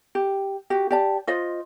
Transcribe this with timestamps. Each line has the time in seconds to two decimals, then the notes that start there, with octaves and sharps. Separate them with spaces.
0.15 G4
0.70 F#4 G4
0.91 G4 D5 A5
1.27 F4 C5 D#5